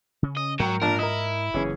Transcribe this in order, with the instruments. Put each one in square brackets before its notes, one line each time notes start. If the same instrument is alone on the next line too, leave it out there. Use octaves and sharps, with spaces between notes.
[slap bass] C#3 C#4
[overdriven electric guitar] D#5
[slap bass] G#2 [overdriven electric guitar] F#3 [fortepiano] A#4 G5 A#5
[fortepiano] A#1 D4 A5 [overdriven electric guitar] A#4
[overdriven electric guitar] E4 [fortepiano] A#4 D#5
[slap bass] F#1 [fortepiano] E3 C#4 G#4